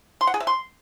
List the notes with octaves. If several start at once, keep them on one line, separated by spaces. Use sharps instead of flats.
C6
F#5
G#4
E5
C6